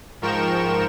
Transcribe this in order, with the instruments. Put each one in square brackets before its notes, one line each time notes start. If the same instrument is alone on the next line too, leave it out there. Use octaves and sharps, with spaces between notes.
[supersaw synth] G#2 F3 A#4 G5 C#6 E7